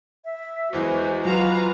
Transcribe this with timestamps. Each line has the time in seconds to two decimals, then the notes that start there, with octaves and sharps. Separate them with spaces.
0.25 E5
0.73 E2 E3 G#3 F#4 C5
1.25 F#3 F4 F#4 B4 F5 A#5